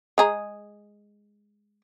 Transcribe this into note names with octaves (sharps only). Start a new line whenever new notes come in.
G#3 G#4 A#5